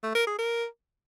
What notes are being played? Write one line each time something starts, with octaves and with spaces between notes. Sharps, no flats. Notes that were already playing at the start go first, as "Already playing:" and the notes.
A3
A#4
G#4
A#4